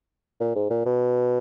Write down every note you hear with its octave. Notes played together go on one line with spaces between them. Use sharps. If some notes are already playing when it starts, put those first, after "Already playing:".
A#2
G#2
A#2
B2